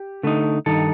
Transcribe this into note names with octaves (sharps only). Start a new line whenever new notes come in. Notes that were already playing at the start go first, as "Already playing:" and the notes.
Already playing: G4
D3 A3 D#4
G2 D#3 D#4 A4